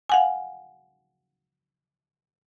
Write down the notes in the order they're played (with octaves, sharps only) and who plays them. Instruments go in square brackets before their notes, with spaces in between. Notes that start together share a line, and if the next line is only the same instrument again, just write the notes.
[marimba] F5 F#5 G#5